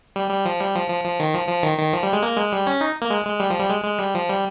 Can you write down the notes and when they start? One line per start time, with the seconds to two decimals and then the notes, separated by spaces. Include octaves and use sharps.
0.16 G3
0.30 G3
0.45 F3
0.60 G3
0.75 F3
0.90 F3
1.04 F3
1.20 D#3
1.34 F3
1.48 F3
1.63 D#3
1.79 D#3
1.93 F3
2.03 G3
2.13 G#3
2.23 A#3
2.37 G#3
2.52 G3
2.67 C#4
2.81 D#4
3.02 A#3
3.10 G#3
3.26 G#3
3.40 G3
3.50 F3
3.60 G3
3.70 G#3
3.84 G#3
3.99 G3
4.15 F3
4.29 G3